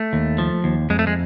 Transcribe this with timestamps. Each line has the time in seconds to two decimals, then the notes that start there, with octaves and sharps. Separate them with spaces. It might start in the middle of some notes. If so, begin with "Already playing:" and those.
Already playing: A3
0.13 D#2
0.38 F3
0.64 D#2
0.90 F2 G#3
0.99 A3
1.07 G#3